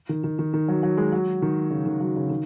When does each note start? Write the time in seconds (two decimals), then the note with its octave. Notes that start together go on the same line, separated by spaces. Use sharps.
0.09 D#3
0.24 D#3
0.39 D#3
0.54 D#3
0.68 F#3
0.83 F#3
0.97 G#3
1.12 F#3
1.42 D#3
1.71 C#3
1.86 D#3
2.01 F#3
2.16 C#3
2.30 D#3